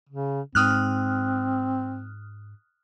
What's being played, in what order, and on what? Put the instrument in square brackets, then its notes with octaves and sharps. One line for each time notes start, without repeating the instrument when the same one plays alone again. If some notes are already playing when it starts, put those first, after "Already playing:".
[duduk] C#3
[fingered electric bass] G#2 [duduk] C4 [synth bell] D#6 F6 F#6